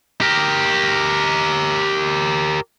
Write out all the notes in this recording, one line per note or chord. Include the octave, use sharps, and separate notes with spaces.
G4 A#4